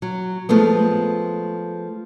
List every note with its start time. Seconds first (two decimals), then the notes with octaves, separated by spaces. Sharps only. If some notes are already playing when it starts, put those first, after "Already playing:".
0.02 F#3
0.49 F3 G#3 A3 B3